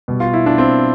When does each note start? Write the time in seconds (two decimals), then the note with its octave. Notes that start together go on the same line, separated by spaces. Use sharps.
0.08 B2 G3
0.20 F4
0.34 E4
0.46 D4
0.58 C4